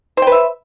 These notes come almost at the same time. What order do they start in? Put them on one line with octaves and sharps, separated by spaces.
C5 G5 B4 E5